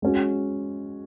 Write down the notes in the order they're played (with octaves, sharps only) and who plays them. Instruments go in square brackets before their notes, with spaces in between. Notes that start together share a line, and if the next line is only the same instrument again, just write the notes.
[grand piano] G#3 C#4 F#4